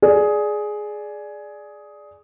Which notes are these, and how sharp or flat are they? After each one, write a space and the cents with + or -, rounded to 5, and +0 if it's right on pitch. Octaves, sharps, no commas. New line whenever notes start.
G#4 +10 D5 +0